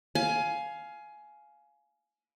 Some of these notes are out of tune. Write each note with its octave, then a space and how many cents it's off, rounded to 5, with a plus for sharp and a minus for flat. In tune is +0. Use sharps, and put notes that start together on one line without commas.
F5 +0 G#5 +20